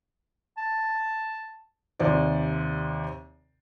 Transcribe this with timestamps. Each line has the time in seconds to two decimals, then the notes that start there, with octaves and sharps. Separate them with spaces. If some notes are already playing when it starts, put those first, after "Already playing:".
0.57 A5
1.99 D#2 C3 C5 D5